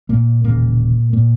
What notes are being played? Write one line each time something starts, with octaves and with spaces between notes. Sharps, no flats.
A#2 A#3
E1 D#2 A#2 C#3 A#3
A#2 A#3